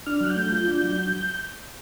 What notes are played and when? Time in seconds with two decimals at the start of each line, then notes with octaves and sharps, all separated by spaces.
0.06 D4 F6
0.21 F#3 F#6
0.30 G6
0.36 A3
0.52 F4 G6
0.68 D4
0.83 F#3